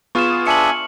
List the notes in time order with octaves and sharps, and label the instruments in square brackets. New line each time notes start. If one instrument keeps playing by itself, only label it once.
[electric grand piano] B3 F4 G#4 [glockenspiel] C#6 F6 E7
[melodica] D4 E5 [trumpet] G#5 [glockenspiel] C#7 F#7